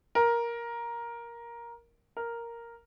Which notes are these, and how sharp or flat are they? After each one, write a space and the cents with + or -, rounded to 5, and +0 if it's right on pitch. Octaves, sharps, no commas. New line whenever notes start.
A#4 +10
A#4 +0